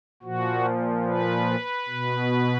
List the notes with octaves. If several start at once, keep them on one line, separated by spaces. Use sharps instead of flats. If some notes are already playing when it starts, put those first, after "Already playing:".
A#2 F3 F#4
B4
B2